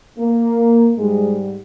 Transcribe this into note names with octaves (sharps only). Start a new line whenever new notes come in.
A#3
G#2 G3 G#3